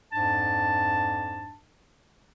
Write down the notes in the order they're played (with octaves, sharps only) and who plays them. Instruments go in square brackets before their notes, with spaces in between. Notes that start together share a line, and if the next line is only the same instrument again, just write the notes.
[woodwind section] F2 G#2 D4 A5